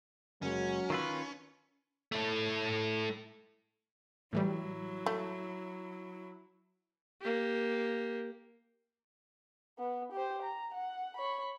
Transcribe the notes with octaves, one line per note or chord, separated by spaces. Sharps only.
F#1 F#3 G#3 C#4
D#3 F4 B4 C#6 E6 B6
A3 E4
A2 E3 F#3 G3 E4
A3
A#3 G4
B3
G4 C5
A#5
F#5
C#5 B5